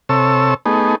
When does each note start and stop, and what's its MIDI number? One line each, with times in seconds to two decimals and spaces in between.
0.09 0.54 48
0.09 0.54 69
0.09 0.54 73
0.09 0.54 88
0.66 0.95 57
0.66 0.95 59
0.66 0.95 63
0.66 0.95 68